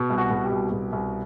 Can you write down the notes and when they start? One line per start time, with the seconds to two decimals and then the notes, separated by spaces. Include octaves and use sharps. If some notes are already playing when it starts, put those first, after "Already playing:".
Already playing: B2
0.10 C2
0.18 F#4
0.30 B2
0.44 G4
0.51 C2
0.71 B2
0.92 C2